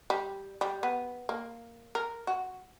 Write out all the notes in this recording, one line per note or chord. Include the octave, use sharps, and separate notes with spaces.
G3
G3
B3
A#3
A#4
F#4